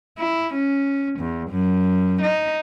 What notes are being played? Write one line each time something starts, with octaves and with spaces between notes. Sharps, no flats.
E4
C#4
E2
F#2
D#4